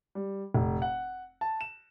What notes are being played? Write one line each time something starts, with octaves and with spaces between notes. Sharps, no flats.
G3
F1
F#5
A5
E7